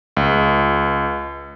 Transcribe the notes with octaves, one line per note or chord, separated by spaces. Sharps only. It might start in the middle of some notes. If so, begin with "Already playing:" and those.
C#2